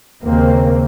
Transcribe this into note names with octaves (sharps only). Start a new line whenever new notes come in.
D#2 C#3 A#3 C4